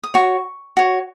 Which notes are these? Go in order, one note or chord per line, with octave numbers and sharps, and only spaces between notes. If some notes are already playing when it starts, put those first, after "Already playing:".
D#6
F#4 C#5 C#6
F#4 C#5